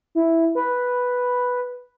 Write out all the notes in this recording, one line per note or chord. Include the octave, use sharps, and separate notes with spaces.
E4
B4